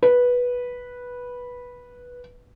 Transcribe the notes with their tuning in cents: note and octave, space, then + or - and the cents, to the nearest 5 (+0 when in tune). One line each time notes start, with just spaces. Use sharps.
B4 -10